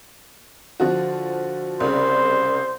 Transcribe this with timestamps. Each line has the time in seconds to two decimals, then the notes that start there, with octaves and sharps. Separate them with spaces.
0.80 D3 F3 F#4
1.80 C2 C#3 C5